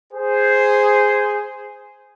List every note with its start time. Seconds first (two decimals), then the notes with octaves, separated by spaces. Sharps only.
0.13 G#4 C5